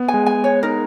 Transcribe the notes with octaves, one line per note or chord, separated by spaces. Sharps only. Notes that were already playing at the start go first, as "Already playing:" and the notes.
Already playing: B3
G#5
G#3
G#5
C#5
D#4 A#4